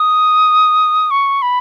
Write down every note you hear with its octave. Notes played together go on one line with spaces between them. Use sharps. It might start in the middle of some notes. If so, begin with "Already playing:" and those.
Already playing: D#6
C#6
B5